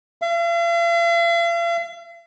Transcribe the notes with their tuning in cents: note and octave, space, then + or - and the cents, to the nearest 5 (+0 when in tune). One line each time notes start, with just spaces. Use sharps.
F5 -45